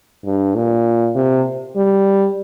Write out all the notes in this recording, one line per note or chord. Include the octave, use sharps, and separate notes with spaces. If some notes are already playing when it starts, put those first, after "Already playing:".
G2
A#2
C3
G3